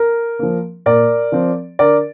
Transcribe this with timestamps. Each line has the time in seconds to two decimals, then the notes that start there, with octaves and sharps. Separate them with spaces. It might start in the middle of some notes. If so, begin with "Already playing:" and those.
Already playing: A#4
0.39 F3 A#3
0.86 A#2 A#4 D5
1.32 F3 C4
1.79 D3 A#4 D5